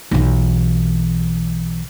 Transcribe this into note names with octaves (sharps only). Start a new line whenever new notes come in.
B1 E3